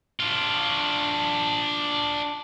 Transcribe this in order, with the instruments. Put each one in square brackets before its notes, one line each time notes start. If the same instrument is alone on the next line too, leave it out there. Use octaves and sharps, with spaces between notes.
[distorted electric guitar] D4 F4